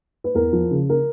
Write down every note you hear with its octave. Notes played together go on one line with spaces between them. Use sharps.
B4
E2 A#4
F3
C#3
A#4